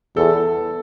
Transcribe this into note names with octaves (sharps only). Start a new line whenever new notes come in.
E2 A4